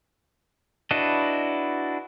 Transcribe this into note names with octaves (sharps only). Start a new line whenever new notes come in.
D4 E4 F#4 B4 D#5